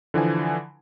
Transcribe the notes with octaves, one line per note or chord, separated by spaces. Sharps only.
D3 E3 F3 G#5